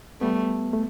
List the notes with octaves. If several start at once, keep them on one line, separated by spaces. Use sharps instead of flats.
G3 A3 B3
A3